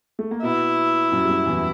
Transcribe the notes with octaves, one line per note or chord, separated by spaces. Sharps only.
A3
A#3
B2 B3 E4
F#2 F#3
G3
F#2 F#3
E2 E3